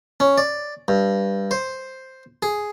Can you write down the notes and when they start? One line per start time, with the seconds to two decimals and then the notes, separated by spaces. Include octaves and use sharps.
0.20 C#4
0.38 D5
0.88 G2
1.51 C5
2.43 G#4